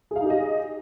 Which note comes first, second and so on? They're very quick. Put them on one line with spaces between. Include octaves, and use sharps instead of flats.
G#4 F5 D#4 G4 D#5